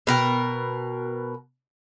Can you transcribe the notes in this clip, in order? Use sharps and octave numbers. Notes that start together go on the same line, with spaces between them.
B2 A#4 G5